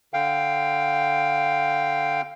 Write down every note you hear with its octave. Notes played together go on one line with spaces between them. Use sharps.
D3 F5 G5